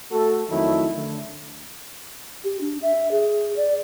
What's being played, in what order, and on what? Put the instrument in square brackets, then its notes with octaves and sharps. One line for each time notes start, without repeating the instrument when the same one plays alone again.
[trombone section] A3 F#4 A4
F2 D#3 F#3 A3 E4
D3 A3
[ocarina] G4
D4
E5
G#4
D5